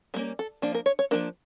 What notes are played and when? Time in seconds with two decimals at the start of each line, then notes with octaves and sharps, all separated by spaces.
0.14 G3 A#3 C#4 A#4
0.39 A4
0.62 F3 A#3 D4
0.75 A#4
0.86 C#5
0.99 C#5
1.11 F3 A#3 D4 A#4